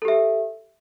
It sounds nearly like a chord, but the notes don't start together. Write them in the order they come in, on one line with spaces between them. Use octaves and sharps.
A4 G4 E5